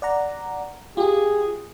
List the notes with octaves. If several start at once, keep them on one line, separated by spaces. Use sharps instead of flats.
D5 F#5 A#5
F4 G4 G#4